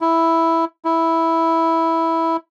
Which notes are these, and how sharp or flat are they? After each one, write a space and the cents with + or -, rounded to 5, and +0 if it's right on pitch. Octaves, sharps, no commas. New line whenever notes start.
E4 +0
E4 -5